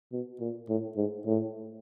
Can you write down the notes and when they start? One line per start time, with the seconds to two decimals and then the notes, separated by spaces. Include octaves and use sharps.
0.12 B2
0.40 A#2
0.69 A2
0.97 G#2
1.26 A2